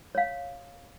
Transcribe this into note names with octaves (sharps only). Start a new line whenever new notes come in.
C#5 F5